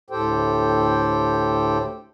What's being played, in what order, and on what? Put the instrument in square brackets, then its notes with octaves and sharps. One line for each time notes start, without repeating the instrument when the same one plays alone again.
[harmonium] D2 A2 G4 A4 C5 G5